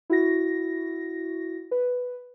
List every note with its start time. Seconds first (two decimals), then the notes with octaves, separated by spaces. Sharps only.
0.10 E4 F#4 A#6
1.71 B4